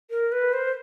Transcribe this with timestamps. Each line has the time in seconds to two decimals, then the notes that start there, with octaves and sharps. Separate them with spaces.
0.10 A#4
0.32 B4
0.53 C5